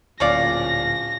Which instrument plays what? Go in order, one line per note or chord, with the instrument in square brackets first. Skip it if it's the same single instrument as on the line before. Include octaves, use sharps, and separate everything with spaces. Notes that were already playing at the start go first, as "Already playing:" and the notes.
[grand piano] D1 A#2 F5 [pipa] C#4 C#5 D5 [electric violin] A#6